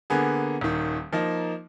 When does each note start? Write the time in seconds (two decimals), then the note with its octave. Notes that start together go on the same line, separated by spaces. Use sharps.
0.10 D3 A#3 B3 G#4
0.61 D#1 D#3
1.13 F3 A#3 D#4